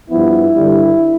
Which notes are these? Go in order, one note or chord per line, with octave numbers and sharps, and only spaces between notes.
G2 F3 B3 E4
G2 D3 G3